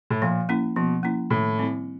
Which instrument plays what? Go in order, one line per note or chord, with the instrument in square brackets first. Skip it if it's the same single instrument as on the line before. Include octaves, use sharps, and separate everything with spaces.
[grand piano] A2
[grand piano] A#2 [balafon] F3
[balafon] A#3 C#4 E4
[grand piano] B2 [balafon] F3
[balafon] A#3 C#4 E4
[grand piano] A2 [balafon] D#3
[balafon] G3 C4 E4